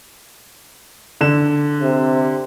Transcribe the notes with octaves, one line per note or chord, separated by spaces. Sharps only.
D3 E7
C3